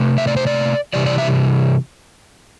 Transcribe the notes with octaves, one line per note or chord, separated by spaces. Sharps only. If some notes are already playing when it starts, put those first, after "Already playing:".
Already playing: C3 A3
E5
D5
C5
D5
C3 E3 G3 D5
D5
E5